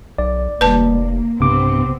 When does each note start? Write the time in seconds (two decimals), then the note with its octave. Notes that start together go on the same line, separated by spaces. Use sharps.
0.18 B1 D5
0.61 F1 D#2 G3 B4 A5
0.94 A#3
1.40 B1 G2 C3 B3 C4 D6